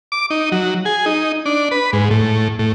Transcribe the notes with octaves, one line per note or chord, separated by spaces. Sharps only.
D6
D#4
F#3
G#4
D#4
D4
B4
G#2
A2
A2